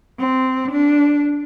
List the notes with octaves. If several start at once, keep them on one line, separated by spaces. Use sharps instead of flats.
C4
D4